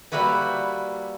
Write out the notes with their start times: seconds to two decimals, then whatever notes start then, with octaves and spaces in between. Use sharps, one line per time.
0.12 G3 A#3 E4 F#4 B4